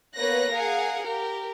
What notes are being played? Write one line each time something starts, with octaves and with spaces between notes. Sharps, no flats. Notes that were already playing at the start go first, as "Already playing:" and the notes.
A#3 B3 B4 C#5 F#6 A#6
G#4 A#4 F5 F#5
G4 A#4